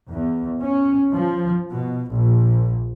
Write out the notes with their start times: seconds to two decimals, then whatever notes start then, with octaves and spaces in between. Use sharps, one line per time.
0.10 E2
0.62 C#4
1.14 F3
1.71 B2
2.12 A#1